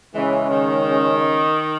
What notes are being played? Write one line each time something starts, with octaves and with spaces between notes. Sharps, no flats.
C#3 E3 G#3 C#4
D#3